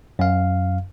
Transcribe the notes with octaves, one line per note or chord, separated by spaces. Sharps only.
F#2 F5